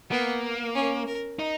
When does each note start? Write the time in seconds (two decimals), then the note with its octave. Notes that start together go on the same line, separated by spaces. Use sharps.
0.10 A#3 B3
0.75 C#4
1.07 A#4
1.39 D#4